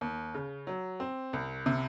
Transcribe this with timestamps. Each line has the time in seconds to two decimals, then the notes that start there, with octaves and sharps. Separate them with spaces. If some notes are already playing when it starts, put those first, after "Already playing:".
0.01 D#2
0.34 C#3
0.67 F#3
1.00 C4
1.33 C2
1.66 C3